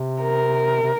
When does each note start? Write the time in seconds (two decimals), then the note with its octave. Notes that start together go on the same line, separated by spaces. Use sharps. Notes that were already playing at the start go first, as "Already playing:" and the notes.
Already playing: C3
0.21 A#4
0.82 C3